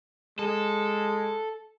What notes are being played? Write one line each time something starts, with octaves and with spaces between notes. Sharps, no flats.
G#3 A4